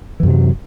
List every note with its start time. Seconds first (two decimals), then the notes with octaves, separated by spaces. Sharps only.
0.20 E3
0.23 F#2
0.26 C3
0.30 F#3